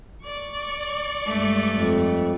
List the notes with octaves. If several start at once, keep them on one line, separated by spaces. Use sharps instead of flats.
D5 C#6
G2 G#3 A3
F2